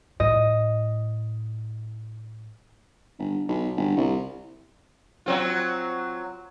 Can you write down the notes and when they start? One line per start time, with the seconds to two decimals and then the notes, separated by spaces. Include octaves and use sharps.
0.20 A2 D#5
3.19 G1
3.49 B1
3.77 G1
3.97 C2
5.26 F#3 C4 F4